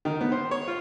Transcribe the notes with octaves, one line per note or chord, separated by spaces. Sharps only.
D#3
B3
C5
C#5
F4